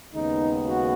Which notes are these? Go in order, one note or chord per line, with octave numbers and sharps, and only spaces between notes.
D#2 C#3 G#3 B3 D#4
F#4